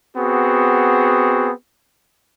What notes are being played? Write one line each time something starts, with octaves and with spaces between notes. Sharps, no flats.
B3 C4 F#4 G#4